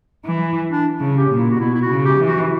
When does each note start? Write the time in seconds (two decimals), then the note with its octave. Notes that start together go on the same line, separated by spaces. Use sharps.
0.25 E3
0.70 D4
1.00 C#3
1.16 G4
1.30 A#2
1.37 E4
1.50 F#4
1.59 B2 E4
1.74 E4
1.81 F#4
1.89 C#3
2.05 G4
2.19 E3
2.27 F#4